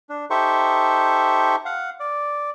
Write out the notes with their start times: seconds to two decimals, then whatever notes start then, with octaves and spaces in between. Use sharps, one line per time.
0.09 D4
0.30 D#4 G4 A4 C5 E5 C#6
1.65 F5 F#5
2.00 D5